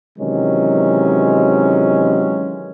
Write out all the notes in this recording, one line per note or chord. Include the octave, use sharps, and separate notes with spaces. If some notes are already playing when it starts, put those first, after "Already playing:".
C3 D#3 E3 F#3 G#3 C#4